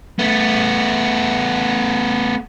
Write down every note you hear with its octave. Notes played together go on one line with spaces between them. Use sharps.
A3 B3